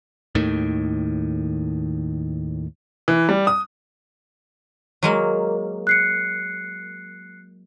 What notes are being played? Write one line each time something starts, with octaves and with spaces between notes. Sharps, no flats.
D#2 A2 D#3
E3
G3
D#6
F#3 G#3 A#3
F#6 C7 C#7